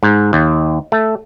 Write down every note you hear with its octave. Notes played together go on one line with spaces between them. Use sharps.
G#2
D#2
A3